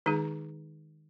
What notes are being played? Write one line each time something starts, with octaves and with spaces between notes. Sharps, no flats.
D#3 G#3 D#4 G#4